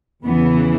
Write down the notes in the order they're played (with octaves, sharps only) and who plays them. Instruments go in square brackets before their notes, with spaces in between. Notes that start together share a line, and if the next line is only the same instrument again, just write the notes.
[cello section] E2 C#3 E3 B3